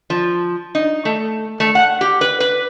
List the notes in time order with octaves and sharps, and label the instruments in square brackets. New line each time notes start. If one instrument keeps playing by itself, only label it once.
[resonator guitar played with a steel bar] F3
D#4
A3
A3
F#5
G4
B4
B4